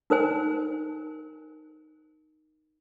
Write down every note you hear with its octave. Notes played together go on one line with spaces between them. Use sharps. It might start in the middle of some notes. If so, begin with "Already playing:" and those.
D#4 A#4 C5 G#5